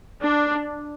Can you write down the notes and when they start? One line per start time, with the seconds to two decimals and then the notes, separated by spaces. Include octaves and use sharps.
0.21 D4